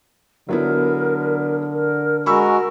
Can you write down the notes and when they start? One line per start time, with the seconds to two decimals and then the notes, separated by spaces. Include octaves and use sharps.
0.49 D3 F#3 B3 E4 A#4
1.73 A#4
2.26 G#3 F#4 A#4 G#5 B5 C#6 E6